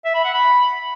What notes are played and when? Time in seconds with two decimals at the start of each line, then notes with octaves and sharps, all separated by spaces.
0.05 E5
0.15 B5
0.25 F#5
0.34 B5